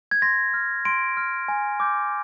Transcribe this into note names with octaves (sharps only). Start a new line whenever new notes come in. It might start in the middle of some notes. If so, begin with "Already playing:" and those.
G#6
C6 A#6
F6
C6 D7
F6
G#5
D6 G6